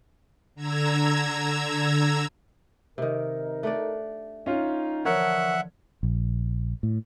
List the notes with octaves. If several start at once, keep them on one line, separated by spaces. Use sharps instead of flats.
D3 A#5 E6 G#6
C3 D#3 D#4 A#4
A3 D4 D5
C#4 D#4 F4
D3 E3 F3 A#4 C#5 E5 F#5
A#1
A2